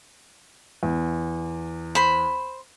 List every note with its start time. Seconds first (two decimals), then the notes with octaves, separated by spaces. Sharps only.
0.83 E2
1.95 C5 B5